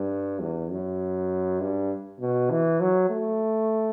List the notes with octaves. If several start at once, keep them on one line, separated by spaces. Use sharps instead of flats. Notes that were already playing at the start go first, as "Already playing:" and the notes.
Already playing: G2
E2
F#2
G2
B2
E3
F#3
A3